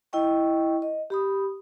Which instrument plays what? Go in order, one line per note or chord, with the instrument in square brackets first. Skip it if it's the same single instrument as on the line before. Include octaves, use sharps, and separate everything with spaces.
[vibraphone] E4 D#5 G5 C#6
D#5
G4 B5 D#6